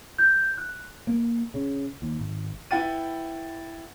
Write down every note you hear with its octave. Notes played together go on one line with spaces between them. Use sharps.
G6
F#6
A#3
C#3
D#2
G#1
E4 B4 F#5 G5 A6 D#7